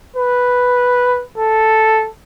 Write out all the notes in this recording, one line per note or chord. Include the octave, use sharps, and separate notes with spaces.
B4
A4